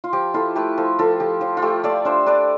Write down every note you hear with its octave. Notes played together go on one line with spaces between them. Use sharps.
F4
F3 G4
E4 F4 A4
A3 G4 B4
F3 F4 A4
F3 F4 A4
F3 G4
F3 F4
F4
A3 G4
A3 D5 F5
D4 C5 E5
D4 B4 D5